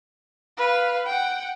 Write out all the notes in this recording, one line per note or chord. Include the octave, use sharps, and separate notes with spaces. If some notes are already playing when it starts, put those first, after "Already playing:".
B4 F5
F#5 G5